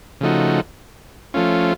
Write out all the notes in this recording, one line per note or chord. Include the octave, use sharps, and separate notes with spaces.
C#3 F3 A3 D#4 F#4
F3 A3 C#4 F4